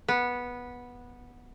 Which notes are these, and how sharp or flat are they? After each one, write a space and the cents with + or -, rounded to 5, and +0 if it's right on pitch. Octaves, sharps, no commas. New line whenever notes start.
B3 -10